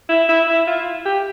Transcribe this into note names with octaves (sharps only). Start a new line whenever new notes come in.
E4
E4
E4
F4
G4